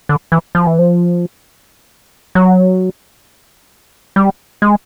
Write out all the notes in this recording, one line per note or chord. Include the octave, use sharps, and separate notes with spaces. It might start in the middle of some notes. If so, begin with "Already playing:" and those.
D3
E3
F3
E3
F3
F#3
G3
G#3